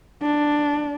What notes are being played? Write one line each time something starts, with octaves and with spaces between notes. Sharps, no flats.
D4